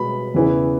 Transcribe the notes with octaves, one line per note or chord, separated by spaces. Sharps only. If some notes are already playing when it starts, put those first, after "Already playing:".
Already playing: B2 G#3 B3 B5
E2 C#3 E3 B3